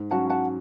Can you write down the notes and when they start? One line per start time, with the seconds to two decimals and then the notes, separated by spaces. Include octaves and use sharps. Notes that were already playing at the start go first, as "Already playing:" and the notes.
Already playing: G#2
0.11 F#3 C#4 F#4 F#5 A5
0.30 F#5 A5